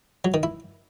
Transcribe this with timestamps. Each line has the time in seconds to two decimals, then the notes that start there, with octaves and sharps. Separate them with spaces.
0.25 F#3
0.34 D#3
0.43 E4